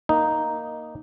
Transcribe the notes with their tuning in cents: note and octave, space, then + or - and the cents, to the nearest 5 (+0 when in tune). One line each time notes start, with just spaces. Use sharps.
A#3 +0 D#4 +0